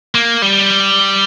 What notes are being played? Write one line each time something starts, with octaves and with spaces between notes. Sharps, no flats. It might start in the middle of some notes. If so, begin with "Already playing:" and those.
A#3
G3